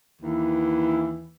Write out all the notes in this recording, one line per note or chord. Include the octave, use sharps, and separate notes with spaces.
D#2 E3